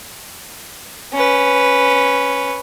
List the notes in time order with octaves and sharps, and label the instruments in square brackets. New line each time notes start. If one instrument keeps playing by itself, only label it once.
[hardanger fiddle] C#4 B4